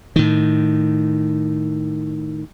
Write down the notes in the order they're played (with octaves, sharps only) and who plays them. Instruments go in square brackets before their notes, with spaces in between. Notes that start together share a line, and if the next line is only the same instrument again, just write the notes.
[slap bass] A2 D#3